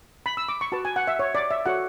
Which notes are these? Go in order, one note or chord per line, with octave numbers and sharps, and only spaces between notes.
B5
E6
D6
C#6
F#4 B4 A5
G#5
F#5
E5
C#5
D5
E5
F#4 A4 C#5 F#5